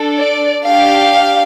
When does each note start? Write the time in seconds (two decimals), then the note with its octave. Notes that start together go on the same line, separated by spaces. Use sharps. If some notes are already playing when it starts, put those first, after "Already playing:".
Already playing: D4 A4
0.19 D5
0.64 D4 G4 F5